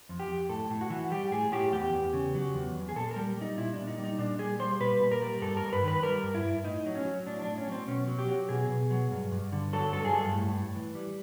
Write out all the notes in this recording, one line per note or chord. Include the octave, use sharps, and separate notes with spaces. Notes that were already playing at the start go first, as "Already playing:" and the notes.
F2
G4
F2
A2 A4
A2
F#4
E3
G3 G4
A2 G#4
A2 G4
E2 G4
E2
C#3
F#3
E2
E2
G#4
A#2 A4
A#4
G3
G3 D#4
A#2 E4
A#2 D4
D#4
G3
D#4
A#2 D4
G3 G#4
G3 C5
A#2 B4
A#2
A#4
G3
G2 A4
A#4
G2
B4
D#3
B4
G3 A#4
G2
E4
G2
A2 D#4
F#3
C#4
F#3
A2 D4
A2 D4
C#4
F#3 C4
B2 C#4
F#3
G4
F#3
B2 G#4
B2
F#3
G2
G2
D3
F#3 A4
G2 A4
G#4
G2 A4
A2
A2
E3
G3